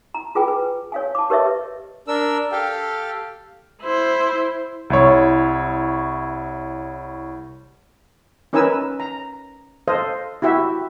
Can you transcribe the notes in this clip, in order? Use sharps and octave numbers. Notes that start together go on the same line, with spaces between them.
A#5
F4 G#4 B4 G5 G#5
B4
C#5 F5 G#5
A5 D6
G4 A#4 B4 C#5 D#5 E5
D4 A#4 E6
G4 A4 F5 G5
E4 C5
C2 E4 C#5
C#4 D#4 A#4 B4 G#5 E6
A#5
A4 C5 D#5 F5
E4 F#4 G4 E5